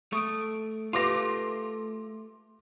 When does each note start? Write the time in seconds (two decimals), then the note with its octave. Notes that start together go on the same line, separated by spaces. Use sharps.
0.13 A3 C#6 D#6 D7
0.93 A3 F4 G4 B4 C6 D6 A#6 F7